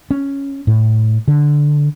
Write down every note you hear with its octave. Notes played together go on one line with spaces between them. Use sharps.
C#4
A2
D3